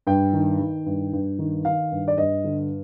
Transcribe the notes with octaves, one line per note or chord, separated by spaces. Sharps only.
G2 G5
D#3
D#3
G2
G2
D#3
D#3 F5
G2
D5
G2 D#5
D3